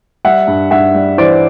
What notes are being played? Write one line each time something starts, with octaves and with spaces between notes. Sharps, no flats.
G3 E5 F#5
G2
G2 E5 F#5
G3
E3 C5 D5